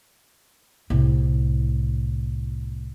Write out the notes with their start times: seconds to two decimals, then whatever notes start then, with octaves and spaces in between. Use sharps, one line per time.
0.90 C2 A2